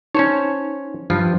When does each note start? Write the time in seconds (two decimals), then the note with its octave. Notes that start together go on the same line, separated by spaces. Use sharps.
0.15 C#4 D#4 C5 C#5
1.10 G2 F3 F4